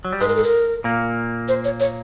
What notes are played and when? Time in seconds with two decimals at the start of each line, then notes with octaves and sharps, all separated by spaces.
0.05 F#3
0.13 G3
0.21 G#2 G#3 B4
0.28 A#4
0.36 A4
0.44 A#4
0.84 A#2 A#3
1.48 C5
1.65 C#5
1.80 C#5